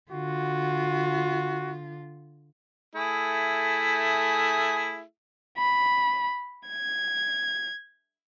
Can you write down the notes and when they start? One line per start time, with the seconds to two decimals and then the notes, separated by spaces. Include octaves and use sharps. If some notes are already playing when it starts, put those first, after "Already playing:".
0.12 D3 F4 F#4
2.95 A3 E4 G#4
5.59 B5
6.68 G#6